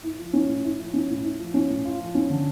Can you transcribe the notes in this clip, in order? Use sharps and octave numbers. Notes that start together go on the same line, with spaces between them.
E4
F3
C#4
A2
E4
F3
C#4
A2
E4
F3
C#4
A2
F4
F3
C#4
D3